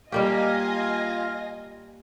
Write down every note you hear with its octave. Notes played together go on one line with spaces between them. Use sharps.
G3 A#3 F4 G4 D#5 F5 G#5 A#6